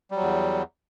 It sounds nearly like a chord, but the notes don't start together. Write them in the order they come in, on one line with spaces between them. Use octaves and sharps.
G3 F#3 E2